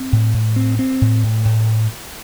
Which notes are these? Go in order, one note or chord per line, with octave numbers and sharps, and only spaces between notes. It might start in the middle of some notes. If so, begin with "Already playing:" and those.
Already playing: C4
A2
A2
C4
C4
A2
A2
A2